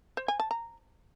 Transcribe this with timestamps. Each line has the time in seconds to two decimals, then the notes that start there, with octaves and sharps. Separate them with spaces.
0.17 C5
0.28 G#5
0.40 A5
0.51 A#5